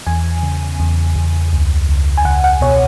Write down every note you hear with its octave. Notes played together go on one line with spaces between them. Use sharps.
E2 G#5
C#3
E2
E2
C#2
C#2
G#5
C#2 F#5
F#5
B2 C#5